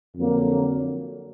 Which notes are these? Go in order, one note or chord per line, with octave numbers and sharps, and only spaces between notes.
F2 D3 F#3 A#3